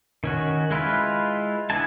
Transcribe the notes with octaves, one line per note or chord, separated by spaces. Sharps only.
D#3 C#4 F#4
G#3 E4 F4 B4
B3 D4 E4 G#5 A5